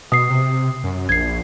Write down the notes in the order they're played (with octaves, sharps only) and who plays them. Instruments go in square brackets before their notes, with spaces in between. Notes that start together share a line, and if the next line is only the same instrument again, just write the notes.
[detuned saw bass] B2 [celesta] D#6 C7
[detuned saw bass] C3
F#2
[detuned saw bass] A#1 [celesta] G#6 C7